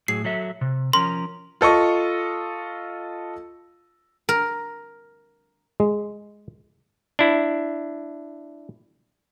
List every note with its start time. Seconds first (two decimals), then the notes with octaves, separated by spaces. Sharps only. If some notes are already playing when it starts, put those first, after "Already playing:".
0.08 A2 F#3 G#4 C7
0.25 F#3 A4 E5
0.61 C3
0.93 F3 C#4 A#4 C6
1.61 F4 A4 D#5 C#6
4.29 A#4
5.80 G#3
7.19 D4 E4